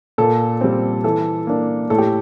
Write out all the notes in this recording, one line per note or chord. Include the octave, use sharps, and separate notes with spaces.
A#2 A4
G3 C4
E3 A4
A#3 D4
A2 A4
G4